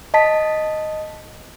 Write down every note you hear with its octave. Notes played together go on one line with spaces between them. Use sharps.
D#5 A5 B6